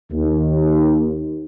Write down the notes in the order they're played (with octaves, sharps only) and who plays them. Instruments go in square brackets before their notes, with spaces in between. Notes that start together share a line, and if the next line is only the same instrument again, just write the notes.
[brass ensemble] D#2